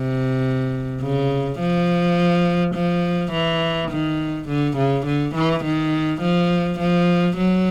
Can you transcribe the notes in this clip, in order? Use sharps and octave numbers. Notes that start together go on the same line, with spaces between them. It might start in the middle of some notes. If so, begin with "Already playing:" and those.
Already playing: C3
C#3
F3
F3
E3
D#3
D3
C#3
D3
E3
D#3
F3
F3
F#3